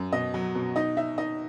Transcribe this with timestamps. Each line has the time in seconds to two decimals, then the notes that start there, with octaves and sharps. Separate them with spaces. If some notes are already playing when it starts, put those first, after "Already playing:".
Already playing: F#2
0.12 B2 D#5
0.34 F#3
0.55 B2
0.76 D#4 D#5
0.97 D#4 E5
1.18 D#4 D#5